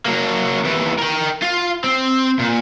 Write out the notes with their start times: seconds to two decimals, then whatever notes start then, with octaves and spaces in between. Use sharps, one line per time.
0.06 F#3 A#3
0.64 D#2 E3
0.98 A#4 G5
1.42 F4
1.84 C4
2.39 A#2